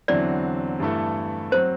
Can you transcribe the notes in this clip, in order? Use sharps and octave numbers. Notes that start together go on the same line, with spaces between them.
E2 D3 F#3 C4 E4 D5
G2 E3 A3 E4 A4
F#3 C4 C5